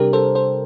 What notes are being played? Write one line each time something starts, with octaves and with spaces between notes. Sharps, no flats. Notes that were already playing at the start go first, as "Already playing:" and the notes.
Already playing: C3 G3 D4 G4 A#4
A4 C5
A4 C5